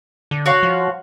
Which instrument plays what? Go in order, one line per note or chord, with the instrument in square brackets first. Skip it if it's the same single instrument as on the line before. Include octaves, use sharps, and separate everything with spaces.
[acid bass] D3
[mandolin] F#4 C#5 F5
[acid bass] F3